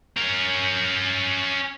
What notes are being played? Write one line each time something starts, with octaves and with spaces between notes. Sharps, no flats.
C#4 A#4